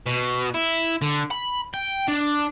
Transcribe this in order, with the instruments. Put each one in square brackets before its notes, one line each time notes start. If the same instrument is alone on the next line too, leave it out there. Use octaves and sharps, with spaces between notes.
[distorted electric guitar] B2
E4
D3
B5
G5
D4